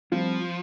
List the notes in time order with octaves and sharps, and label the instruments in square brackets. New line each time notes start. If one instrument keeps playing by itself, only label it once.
[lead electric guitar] F3 [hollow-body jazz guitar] G3 C4 F4